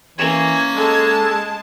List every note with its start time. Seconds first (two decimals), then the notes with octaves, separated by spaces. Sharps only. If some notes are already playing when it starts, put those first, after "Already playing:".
0.18 E3 A#3 C#4 G#6
0.75 G#3 A4 A5